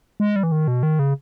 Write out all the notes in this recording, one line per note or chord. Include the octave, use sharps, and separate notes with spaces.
G#3
G3
E3
D#3
B2
D#3
C#3